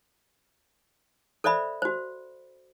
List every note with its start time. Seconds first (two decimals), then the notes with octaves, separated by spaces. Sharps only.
1.44 A4 C5 D5 E5 B5
1.82 F#4 C5